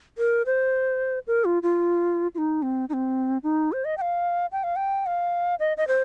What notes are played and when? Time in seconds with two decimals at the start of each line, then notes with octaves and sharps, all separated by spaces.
0.18 A#4
0.46 C5
1.27 A#4
1.45 F4
1.63 F4
2.35 F4
2.38 D#4
2.62 C4
2.89 D#4
2.93 C4
3.43 D#4
3.72 C5
3.85 D#5
3.97 G5
4.01 F5
4.52 G5
4.64 F5
4.76 G5
5.06 F5
5.60 D#5
5.77 D#5
5.88 C5